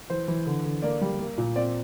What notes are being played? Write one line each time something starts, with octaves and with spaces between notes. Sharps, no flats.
E3 C5
E3
D3
D3
A#3 D5
G3
A#3
A#2
C4 D5